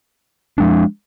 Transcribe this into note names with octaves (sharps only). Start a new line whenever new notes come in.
F3 G#3 D4